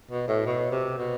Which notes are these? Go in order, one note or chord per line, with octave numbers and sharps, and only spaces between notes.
B2
A2
B2
C3
B2